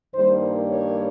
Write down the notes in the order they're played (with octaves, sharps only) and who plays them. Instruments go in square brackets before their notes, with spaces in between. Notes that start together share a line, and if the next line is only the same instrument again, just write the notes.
[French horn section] G2 D#3 G3 A#3 C5
C#5